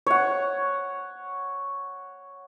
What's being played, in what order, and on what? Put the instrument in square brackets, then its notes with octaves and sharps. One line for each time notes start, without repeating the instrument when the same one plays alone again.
[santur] C#5 F#5